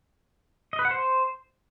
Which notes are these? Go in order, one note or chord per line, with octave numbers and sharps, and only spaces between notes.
D#5
B4
F#5
C5